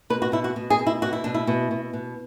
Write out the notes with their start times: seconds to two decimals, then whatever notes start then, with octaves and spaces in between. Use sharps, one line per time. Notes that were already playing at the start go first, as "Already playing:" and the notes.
0.10 B2 B4
0.22 F#4
0.32 B2 E4
0.44 F#4
0.56 B2
0.70 G#4
0.79 B2
0.87 E4
1.02 B2 F#4
1.13 E4
1.24 B2 D4
1.34 E4
1.47 B2
1.71 B2
1.93 B2